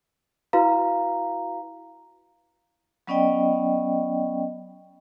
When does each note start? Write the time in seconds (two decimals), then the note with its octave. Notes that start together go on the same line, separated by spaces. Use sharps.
0.53 E4 F#4 B4 F5 A#5
3.07 F#3 B3 C#4 D5 D#5 G5